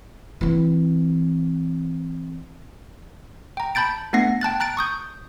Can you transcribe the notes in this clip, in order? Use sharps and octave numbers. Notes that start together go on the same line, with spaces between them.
E3 C4
G5 A#5
A5 B5 G6 A6 D7
A3 B3 D4 F#5 A#6 C7
G5 A5 F#6 A6
A#5 F#6 A6 D7
C#6 D#6 G6